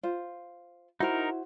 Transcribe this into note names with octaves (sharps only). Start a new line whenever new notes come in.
F4 C5
D#4 E4 F#4 A#4 C5